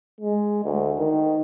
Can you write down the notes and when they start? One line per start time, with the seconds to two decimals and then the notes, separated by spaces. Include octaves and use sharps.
0.20 G#3
0.64 D2
0.99 D#3